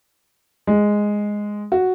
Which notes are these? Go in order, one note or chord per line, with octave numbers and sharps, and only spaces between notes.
G#3
F#4